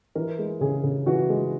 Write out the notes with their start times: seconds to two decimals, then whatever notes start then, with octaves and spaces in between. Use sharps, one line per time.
0.15 E3 A#4
0.39 G#3
0.61 C#3 G#4
0.84 C#3
1.06 E3 F#4
1.29 G#3